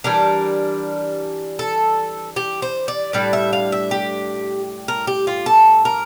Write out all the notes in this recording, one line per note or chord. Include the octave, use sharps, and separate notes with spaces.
E3 G3 D4 A#4
A4
G4
C5
D5
A2 G3 D4 D5
E5
F5
E5
G4
A#4
G4
F4
A4
A#4